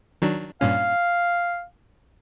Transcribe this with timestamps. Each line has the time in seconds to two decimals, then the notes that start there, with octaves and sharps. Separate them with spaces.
0.22 D#3 F#3 D4
0.61 G2 A#2 C#4 F5